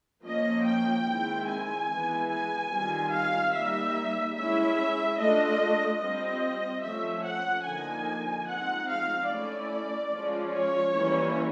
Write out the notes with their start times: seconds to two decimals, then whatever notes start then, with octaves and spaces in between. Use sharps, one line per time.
0.24 F3 A#3 C#4 D#5
0.65 G5
1.06 D#3 G#3 C4 E4
1.48 G#5
1.89 E3 G#3 B3
2.30 G#5
2.70 D#3 G3 C4 F4
3.12 F5
3.53 G3 A#3 D#4 E5
4.35 G#3 C#4 E4 E5
5.17 A3 D4 F4 D#5
6.00 G3 C4 F4 D#5
6.83 F3 A3 C#4 E5
7.23 F#5
7.65 D3 F3 A#3 D#4 G#5
8.47 F3 G#3 C4 D#4 F#5
8.88 F5
9.29 A3 C#4 E4 D5
10.11 F3 G#3 C#4 F4
10.52 C#5
10.94 E3 G3 A#3 C#4 E4